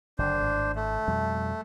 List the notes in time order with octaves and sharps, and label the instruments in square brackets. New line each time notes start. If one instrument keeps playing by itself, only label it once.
[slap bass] F#1 D3 [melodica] D4 C5
[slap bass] G#1 A2
[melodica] A3
[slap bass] F2 B2 G3